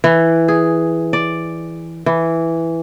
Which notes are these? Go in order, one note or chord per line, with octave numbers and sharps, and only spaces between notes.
E3
G#4
D5
E3